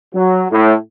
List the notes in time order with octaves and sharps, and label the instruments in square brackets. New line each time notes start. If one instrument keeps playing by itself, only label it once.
[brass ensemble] F#3
A2